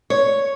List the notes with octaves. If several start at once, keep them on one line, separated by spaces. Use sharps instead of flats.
C#5